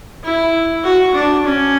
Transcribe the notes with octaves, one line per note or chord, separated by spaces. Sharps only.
E4
F#4
D4
C#4